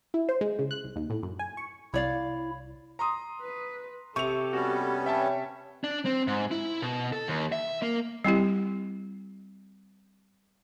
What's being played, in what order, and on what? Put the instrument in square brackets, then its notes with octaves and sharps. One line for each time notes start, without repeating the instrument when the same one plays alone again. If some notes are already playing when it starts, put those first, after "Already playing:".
[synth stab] E4
C5
G#3
C#3
F#6
C2
D#2
A2
F#2
G#5
C#6
[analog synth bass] C2 [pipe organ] E4 [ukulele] C#5 D5 F5
[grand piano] A#5 C6 D#6
[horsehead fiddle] B4
[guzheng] C3 [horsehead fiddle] G4 A4 [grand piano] C#6 F7
[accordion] G3 B3 C#4 [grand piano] F#4
[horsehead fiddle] C#5 [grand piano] E5 G5 A5
[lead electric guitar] D4
C4
G#2
E4
B2
A4
D#2
E5
A#3
[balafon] G3 C4 E4 G4